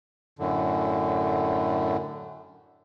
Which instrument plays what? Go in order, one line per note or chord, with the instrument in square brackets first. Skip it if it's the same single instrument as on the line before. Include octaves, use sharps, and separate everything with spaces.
[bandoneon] F#2 A2 D3